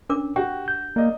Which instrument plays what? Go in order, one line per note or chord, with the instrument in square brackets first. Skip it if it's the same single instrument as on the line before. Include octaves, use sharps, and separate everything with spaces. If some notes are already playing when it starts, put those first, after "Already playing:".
[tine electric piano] C#4 [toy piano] D4 A#4 D6
[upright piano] F#4 [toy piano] G4 [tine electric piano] G5
[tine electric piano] G6
[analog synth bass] A#3 [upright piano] D5 D#5